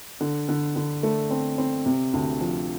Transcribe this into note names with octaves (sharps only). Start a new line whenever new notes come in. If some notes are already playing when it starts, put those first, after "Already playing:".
D3
D3
D3
A3
C4
C4
C3
D2
F3